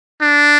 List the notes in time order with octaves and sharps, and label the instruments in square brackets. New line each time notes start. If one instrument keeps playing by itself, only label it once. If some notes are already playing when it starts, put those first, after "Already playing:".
[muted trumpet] D4